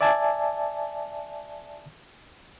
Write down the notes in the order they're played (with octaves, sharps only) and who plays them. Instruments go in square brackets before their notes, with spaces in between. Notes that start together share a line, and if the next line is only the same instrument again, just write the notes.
[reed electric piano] D5 E5 G#5 A5